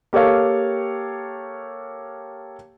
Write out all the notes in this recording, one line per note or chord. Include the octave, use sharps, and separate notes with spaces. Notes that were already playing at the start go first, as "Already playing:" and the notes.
A#3 G4 A4 C#5 F5